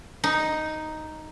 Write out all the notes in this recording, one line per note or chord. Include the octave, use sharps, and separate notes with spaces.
D#4